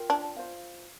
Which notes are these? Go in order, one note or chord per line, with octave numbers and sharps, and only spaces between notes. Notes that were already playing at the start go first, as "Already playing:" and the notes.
Already playing: F4 A#4 G5
D4
F4 C5 F5